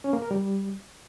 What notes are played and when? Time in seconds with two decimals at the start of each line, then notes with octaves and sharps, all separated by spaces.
0.04 C#4
0.13 A#3
0.22 A#4
0.31 G3